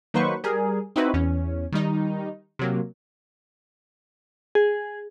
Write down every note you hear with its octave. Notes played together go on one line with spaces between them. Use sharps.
D#3 F#3 A#3 B4 C5 C#6
G3 G#4 A#4
C4 D#4 E4 F#4 B4 C5
E2 C#4
D#3 G3 D#4
C3 F#3 A#3
G#4